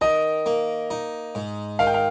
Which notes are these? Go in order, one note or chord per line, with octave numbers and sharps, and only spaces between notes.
D#3 D#5
A#3
D#4
G#2
D#3 F5
G5
F5